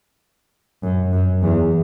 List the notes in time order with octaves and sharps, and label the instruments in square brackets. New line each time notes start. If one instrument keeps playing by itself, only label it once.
[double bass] F#2
F#2
E2